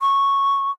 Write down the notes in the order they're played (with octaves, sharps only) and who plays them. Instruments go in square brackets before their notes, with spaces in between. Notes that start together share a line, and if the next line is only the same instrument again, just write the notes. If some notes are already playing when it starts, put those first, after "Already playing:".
[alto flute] C#6